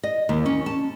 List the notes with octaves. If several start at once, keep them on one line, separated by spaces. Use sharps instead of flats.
D#5
D#2
C#4
A5